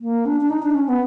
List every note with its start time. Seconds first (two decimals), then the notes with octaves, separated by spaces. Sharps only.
0.01 A#3
0.25 D4
0.41 D4
0.50 D#4
0.63 D4
0.75 C#4
0.88 B3